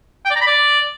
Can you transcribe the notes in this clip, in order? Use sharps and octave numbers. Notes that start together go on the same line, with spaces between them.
G5
D5
A#5
B5
D5